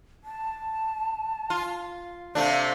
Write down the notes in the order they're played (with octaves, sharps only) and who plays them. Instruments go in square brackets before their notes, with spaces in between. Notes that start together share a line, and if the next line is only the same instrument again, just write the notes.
[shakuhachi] A5
[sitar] F4
[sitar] C3 A3 D4 [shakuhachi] F5